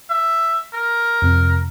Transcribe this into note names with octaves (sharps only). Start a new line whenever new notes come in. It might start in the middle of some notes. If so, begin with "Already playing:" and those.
E5
A#4
F2 C3